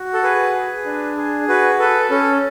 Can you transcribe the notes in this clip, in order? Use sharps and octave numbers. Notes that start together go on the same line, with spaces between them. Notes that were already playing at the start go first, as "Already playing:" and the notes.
Already playing: F#4
A4
G#4 B4
G#4
D4
G#4
F#4 B4
A4 B4
C#4 A4